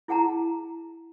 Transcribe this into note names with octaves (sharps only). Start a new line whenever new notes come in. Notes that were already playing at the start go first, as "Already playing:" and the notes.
E4 G#4 F#5 A5 A#5